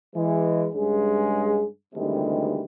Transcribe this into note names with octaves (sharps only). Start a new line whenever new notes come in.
E3 G#3
G2 C#3 G#3 G#4
D2 C3 D#3 E3 G3 G#3